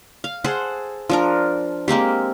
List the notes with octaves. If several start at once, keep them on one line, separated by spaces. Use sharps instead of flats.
F5
G#4 A4 C5 F#5
F3 D4 A#4
G#3 A#3 C4 G4